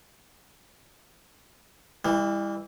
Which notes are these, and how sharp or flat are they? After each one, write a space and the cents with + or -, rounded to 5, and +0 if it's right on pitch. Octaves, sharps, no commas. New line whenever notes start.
E3 +0 G3 +40